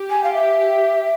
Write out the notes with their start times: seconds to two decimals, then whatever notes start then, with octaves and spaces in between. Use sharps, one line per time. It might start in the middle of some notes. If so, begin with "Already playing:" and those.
Already playing: G4
0.10 G#5
0.23 F5
0.34 E5